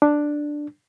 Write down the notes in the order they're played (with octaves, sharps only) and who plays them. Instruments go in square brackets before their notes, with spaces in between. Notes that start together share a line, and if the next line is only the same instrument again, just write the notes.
[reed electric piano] D4